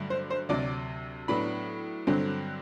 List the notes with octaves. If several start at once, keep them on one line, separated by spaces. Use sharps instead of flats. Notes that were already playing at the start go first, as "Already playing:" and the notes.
Already playing: G2 D3 F#3 A3
C5
C5
D2 C3 F#3 D5
A2 F#3 B3 D4 B5
G2 D3 F#3 C4